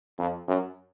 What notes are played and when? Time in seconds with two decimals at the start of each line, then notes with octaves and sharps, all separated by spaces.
0.19 F2
0.48 F#2